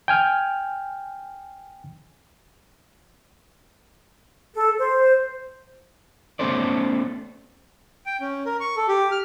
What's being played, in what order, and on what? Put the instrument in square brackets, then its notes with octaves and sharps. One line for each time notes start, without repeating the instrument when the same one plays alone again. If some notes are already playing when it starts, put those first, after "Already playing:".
[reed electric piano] G5 G#5 F6
[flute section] A4
C5
[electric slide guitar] A3 B3 C#4 A4 C5 D5
[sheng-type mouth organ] G5
C#4
A#4
C#6
A4
G4
F6